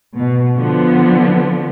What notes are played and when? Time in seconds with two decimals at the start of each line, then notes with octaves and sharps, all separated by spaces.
0.16 B2
0.57 D3 F3 B3